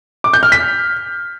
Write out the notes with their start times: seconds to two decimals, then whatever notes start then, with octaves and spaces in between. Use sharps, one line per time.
0.24 D6
0.33 G6
0.43 F6
0.52 B6